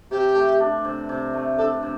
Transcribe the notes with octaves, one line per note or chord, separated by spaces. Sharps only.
C3 G4
A3
D4
C3
C3
A3
D4 A4
C3